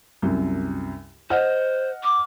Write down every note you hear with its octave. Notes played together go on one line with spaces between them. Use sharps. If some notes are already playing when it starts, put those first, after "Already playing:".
C2 F#2
C5 D#5 F#5 F6
D6